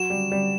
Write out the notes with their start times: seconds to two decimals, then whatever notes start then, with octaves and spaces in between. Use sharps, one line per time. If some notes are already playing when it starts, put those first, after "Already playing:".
Already playing: F#3 F#4 E7
0.10 G3
0.32 G3